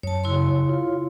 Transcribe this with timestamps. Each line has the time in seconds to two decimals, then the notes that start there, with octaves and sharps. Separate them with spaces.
0.03 F#2 C#5 A5
0.24 C#3 E4 C#5 C6
0.69 F4